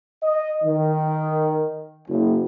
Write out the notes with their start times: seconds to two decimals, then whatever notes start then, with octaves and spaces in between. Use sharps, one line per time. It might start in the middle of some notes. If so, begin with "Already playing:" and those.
0.23 D#5
0.64 D#3
2.08 F#1